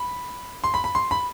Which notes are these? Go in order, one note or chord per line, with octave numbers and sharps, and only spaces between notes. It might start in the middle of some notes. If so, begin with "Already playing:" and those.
Already playing: B5
C6
B5
B5
C6
B5